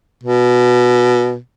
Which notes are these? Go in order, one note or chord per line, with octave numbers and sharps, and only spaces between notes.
B2